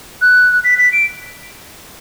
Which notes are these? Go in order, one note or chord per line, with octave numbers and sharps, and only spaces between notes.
F#6
B6
B6
D7